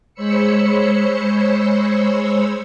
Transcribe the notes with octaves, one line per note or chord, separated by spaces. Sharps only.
G#3 C5 C#5 B5 E6 C#7